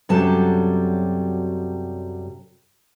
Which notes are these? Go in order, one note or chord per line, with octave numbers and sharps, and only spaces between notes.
F#2 C3 F#3 G3 A4 A5